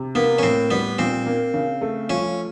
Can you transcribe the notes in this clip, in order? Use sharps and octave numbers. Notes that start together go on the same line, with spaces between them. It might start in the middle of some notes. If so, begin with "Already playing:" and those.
Already playing: C3
A#3 B3
C#4
A2 C4
G3 B3
A#2 C4
A#3
C#3
A3
F3 C#4